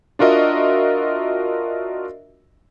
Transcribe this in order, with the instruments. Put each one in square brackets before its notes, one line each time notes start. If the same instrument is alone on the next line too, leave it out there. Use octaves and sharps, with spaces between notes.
[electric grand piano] D4 F4 F#4 A#4 D#5 E5